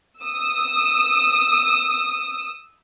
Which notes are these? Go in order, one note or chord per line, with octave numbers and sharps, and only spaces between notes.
D#6 E6